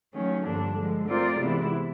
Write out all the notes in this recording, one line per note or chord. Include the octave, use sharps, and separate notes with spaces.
D#3 F#3 A3 C#4
G2 D3 F3 A#3 D4
D3 F3 G#3
A3 C4 F4 A#4 D5
C3 E3 G#3 B3 E4